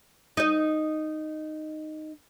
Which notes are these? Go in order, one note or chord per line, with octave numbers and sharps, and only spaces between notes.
D#4 D#5